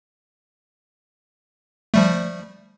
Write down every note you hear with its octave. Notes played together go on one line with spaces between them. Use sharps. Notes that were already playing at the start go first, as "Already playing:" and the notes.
F3 G3 A3